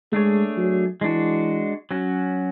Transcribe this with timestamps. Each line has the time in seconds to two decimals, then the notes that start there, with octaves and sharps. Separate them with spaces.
0.12 G#3 A3 D4 G#4 C#5
0.57 F#3
1.01 E3 G#3 D4 F#4
1.91 F#3 C#4 F#4